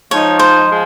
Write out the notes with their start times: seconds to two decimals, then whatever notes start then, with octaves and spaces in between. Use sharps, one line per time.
0.11 F3 G#3 D#4 C#5
0.39 C5
0.67 F3 G#3